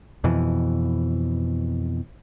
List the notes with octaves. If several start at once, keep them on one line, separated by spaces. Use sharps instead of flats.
F2 B2 E3